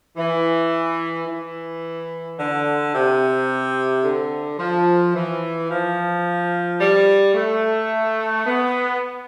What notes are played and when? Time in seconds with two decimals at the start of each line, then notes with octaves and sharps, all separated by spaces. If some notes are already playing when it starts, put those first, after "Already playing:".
0.17 E3
1.27 E3
2.37 D3
2.93 C3
4.04 D3
4.58 F3
5.14 E3
5.70 F3
6.80 G3
7.34 A3
8.46 B3